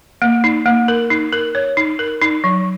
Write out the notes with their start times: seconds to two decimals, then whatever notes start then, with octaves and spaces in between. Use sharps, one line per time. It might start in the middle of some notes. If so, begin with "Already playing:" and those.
0.22 A#3
0.44 D#4
0.66 A#3
0.88 A#4
1.10 D#4
1.33 A#4
1.55 C#5
1.77 D#4
1.99 A#4
2.22 D#4
2.44 F#3